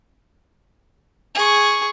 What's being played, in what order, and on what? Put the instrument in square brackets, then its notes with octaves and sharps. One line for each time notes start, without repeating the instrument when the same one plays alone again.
[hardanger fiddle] G#4 C#6